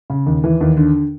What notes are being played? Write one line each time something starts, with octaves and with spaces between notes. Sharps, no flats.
C#3
D#2
E3
D#2
D3